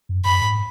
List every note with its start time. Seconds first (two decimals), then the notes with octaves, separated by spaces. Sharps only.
0.09 F#2
0.25 F#2 B5
0.41 G#2